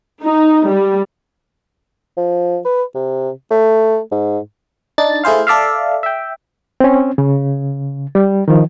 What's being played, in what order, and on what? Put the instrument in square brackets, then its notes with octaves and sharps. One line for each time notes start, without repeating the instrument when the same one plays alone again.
[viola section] D#4
G3
[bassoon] F3
B4
C3
A3
G#2
[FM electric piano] D4 D#4 A6
A3 E4 G#4 C5 F5
A4 D5 E5 F5
E5 G5
[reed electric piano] C4 C#4
C#3
G3
D#3 F3